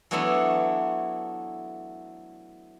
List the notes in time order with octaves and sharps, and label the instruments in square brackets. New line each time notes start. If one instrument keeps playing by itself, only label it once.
[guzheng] E3 F#3 A3 B3 D4 E4